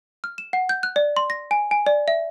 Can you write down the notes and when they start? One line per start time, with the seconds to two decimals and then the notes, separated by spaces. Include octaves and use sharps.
0.24 F6
0.38 E7
0.53 F#5
0.69 G6
0.83 F#6
0.96 D5
1.17 C6
1.30 A#6
1.51 G#5
1.71 G#5
1.86 D5
2.08 E5